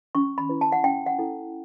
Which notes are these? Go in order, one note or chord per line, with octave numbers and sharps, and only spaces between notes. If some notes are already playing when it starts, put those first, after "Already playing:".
C#4 C#6
B5
E4 B4
A5
F#5
C#4 G5
F#5
E4 A4